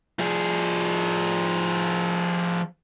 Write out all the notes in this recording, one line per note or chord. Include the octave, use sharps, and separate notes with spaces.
F3 G#4